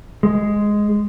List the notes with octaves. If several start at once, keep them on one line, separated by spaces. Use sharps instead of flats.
G#3